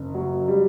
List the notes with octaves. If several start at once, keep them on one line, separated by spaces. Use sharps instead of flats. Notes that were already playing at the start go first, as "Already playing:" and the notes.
Already playing: F#1
F#3
G3